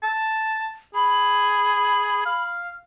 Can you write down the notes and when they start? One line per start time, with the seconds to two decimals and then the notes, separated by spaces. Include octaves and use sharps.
0.03 A5
0.95 G#4 B5
2.26 F5